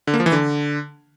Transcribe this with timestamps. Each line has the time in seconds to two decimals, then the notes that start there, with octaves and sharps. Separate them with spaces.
0.07 D3
0.14 A#3
0.20 F3
0.26 E3
0.32 D3